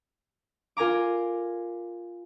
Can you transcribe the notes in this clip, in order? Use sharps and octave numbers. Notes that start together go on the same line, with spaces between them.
F4 A#4 G#5 A#5 D6